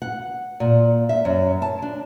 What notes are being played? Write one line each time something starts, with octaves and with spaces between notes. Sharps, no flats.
F#5
A#2
E5
F#2
A5
D4